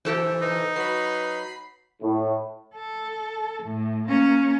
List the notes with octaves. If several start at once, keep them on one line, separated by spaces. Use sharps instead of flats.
E3 G4 A4 C5
D#4 B4
F#3 B4 B5 C7
A2
A4
A2
A#3 C#4